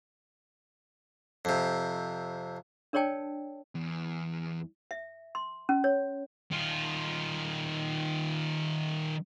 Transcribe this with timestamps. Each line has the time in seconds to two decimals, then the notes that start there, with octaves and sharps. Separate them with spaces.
1.45 F2 C3
2.93 D4 A#4 C#5 D5 G5 A5
3.75 E2
4.91 E5
5.35 C6
5.69 C#4
5.84 C#5
6.51 D#3 F4